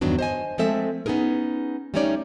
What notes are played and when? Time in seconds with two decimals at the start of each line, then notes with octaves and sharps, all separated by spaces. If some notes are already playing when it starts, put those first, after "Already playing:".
0.01 E2 G2 D#3 F#3 B3 D4
0.19 C5 D#5 G#5
0.58 F3 G#3 A3 C4 A4 E5
1.06 B3 C#4 D#4 G#4 A#4
1.94 G3 A3 C#4 D#4 C#5 D5